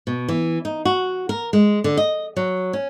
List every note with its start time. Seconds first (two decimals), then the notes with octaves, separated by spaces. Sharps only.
0.07 B2
0.28 E3
0.65 D#4
0.85 F#4
1.29 A#4
1.53 G#3
1.84 D3
1.97 D#5
2.36 F#3
2.73 C#4